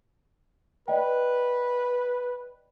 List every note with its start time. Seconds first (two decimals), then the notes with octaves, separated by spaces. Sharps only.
0.88 B4 D5 D#5 G5